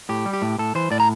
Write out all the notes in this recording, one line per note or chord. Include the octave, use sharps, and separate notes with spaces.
A2 G4
G3
G4
A2
A2 A4
E3 C5
A2 D5
A#5